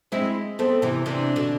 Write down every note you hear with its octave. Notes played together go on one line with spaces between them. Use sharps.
G#3 C4 E4
A3 B3 C4
C3 E3
C3 E3 D4
B2 D3